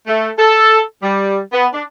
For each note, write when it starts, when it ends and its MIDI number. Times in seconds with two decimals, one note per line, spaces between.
0.07 0.31 57
0.38 0.78 69
1.03 1.39 55
1.53 1.67 59
1.73 1.82 62